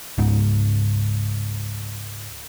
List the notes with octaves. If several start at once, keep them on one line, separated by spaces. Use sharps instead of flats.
C#2 G#2